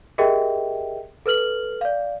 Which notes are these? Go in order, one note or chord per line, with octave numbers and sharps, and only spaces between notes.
G4 G#4 A#4 D#5 E5 G5
A4 B4 F6 F#7
D5 F5